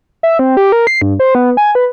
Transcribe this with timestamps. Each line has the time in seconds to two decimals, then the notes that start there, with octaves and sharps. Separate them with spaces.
0.23 E5
0.39 C4
0.57 G4
0.72 A#4
0.87 C7
1.02 G2
1.20 C5
1.35 B3
1.57 G#5
1.75 B4